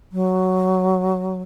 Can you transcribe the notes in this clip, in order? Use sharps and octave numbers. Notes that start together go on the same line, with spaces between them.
F#3